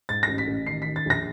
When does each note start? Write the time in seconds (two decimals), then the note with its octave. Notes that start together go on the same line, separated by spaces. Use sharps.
0.09 G#2 A6
0.23 A#6
0.28 A1
0.38 B6
0.47 A1
0.67 D#3 C7
0.82 B6
0.86 D#3
0.96 A6
1.06 A#1 A#6